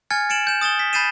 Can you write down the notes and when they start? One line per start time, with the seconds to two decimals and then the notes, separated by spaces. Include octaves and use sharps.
0.10 G#5 F6 G#6 A6 C#7
0.29 A6 C#7 D7 E7 F#7
0.47 G6 E7
0.61 D#6 A6 E7 G7
0.79 B6
0.93 B5 G6 A6 C7 D#7 E7